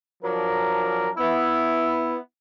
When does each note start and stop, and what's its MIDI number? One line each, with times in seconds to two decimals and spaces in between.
0.23 1.09 53
0.23 1.09 54
0.23 1.09 62
0.23 1.09 70
1.18 2.16 59
1.18 2.16 64